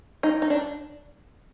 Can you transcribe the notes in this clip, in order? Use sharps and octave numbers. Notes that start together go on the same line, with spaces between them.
D#4
D#4
D4